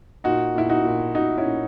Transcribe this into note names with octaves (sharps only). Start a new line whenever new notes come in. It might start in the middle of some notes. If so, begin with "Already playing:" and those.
A#2 D#4 F#4
A#2 E4
D#4 F#4
A#2
A#2 D#4 F#4
C#4 E4
A#2